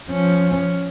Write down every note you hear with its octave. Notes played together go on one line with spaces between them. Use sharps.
F3 C#4